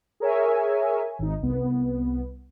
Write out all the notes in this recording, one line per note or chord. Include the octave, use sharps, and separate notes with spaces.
G#4 A#4 C#5 E5 G#5
G#1 D#4
C2 B3